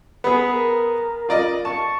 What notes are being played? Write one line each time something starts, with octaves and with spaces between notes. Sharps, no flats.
B3 G#4 B5
A#4
F4 D5 D#5
A5 C#6